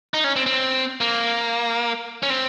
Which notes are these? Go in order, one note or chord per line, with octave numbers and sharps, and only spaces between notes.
D#4
C#4
C4
C4
A#3
C#4
C4